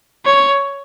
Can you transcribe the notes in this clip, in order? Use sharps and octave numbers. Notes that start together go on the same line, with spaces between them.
C#5